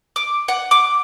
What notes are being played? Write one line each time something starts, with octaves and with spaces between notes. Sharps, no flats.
D6
F#5
D6